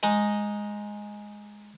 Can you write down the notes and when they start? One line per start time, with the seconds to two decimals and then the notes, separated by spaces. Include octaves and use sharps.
0.03 G#3 D#4